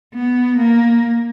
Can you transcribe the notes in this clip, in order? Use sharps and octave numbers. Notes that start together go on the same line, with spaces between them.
B3
A#3